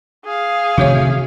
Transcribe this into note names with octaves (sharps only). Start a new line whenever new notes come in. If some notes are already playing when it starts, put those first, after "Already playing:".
G#4 F5
C3 D#3 A3 F#4 C#5 E5